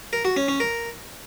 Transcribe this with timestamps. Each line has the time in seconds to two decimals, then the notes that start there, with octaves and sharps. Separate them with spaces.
0.13 A#4
0.25 F#4
0.37 C#4
0.48 C#4
0.60 A#4